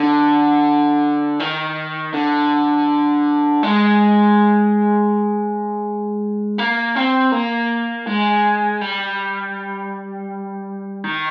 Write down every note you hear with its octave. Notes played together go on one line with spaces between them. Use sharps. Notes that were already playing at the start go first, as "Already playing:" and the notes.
Already playing: D3
D#3
D3
G#3
A#3
C4
A#3
G#3
G3
D#3